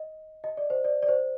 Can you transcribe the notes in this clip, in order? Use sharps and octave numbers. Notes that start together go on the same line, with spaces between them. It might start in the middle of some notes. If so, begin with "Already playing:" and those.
Already playing: D#5
D#5
D5
C5
D5
D5
C5